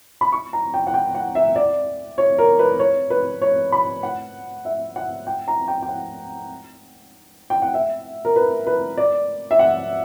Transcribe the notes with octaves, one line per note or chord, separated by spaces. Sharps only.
B5
C#6
A#5
G5
F#5
G5
F#5
E5
D5
C#5
A#4
B4
C#5
B4
C#5
B5
F#5
E5
F#5
G5
A#5
G5
G5
F#5
G5
F#5
E5
A#4
B4
B4
D5
E5
F#5